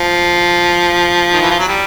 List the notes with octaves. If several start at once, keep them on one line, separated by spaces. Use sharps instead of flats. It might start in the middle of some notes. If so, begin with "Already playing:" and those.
Already playing: F3
D#3
E3
F3
F#3
G3